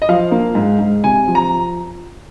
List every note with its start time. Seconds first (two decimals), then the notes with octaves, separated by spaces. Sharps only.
0.02 D#5
0.09 F3 F5
0.31 A#3
0.55 G#2
0.79 G#2
1.04 C3 G#5
1.28 F3
1.35 A#5